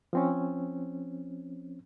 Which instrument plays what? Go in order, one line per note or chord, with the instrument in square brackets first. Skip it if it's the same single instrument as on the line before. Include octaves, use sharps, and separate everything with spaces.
[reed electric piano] F3 C4 C#4